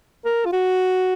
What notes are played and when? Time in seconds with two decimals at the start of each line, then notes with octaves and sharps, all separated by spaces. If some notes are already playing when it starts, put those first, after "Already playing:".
0.25 A#4
0.45 F4
0.53 F#4